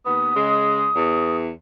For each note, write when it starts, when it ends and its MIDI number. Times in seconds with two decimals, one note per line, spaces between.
0.06 0.35 39
0.06 0.35 59
0.06 1.36 87
0.36 0.88 49
0.36 0.88 56
0.96 1.49 40